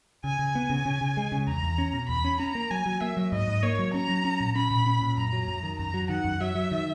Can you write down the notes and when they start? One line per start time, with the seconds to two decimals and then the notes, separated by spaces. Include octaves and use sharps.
0.24 C#3 G#5
0.39 C#3
0.55 B3
0.70 C#3
0.85 C#3
1.01 C#3
1.17 G#3
1.32 C#3
1.47 E2 A#5
1.63 E2
1.78 C#4
1.93 B2
2.08 E2 B5
2.24 C#4
2.40 C#4 A#5
2.55 A#3
2.71 F#3 G#5
2.86 F#3
3.01 A#3 E5
3.17 F#3
3.32 G#2 D#5
3.47 G#2
3.63 A#3 C#5
3.79 F#3
3.94 C#4 A#5
4.09 F#3
4.25 C#4
4.40 A#2
4.56 C#4 B5
4.71 A#2
4.86 C#4
5.02 A#2
5.17 F#2 A#5
5.32 F#3
5.48 F#2
5.63 D#3
5.79 F#2 A#5
5.94 F#3
6.09 D#3 F#5
6.25 F#2
6.40 F#3 E5
6.55 F#3
6.71 D#3